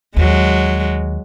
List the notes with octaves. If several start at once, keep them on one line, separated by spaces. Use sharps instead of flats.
D#2 F#3 G#3